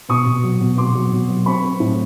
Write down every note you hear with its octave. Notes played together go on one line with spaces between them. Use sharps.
B2 C#6 D#6
B2
F#3
B2
B2 C6 D6
F#3
B2
F#3
C4 B5 C#6
C4
A2